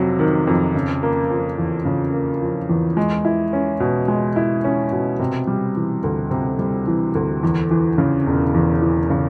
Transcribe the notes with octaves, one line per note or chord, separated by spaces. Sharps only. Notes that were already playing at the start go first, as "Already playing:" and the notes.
Already playing: F2 C3 F#3
D#3
F2
C#3
A#3
F3
E2
C#3
A#3
F3
E2
G#3
E4
C#4
B2
G#3
E4
C#4
B2
C3
G3
E3
D2
C3
G3
E3
D2
E2
E3
C#3
E1
E2
E3
C#3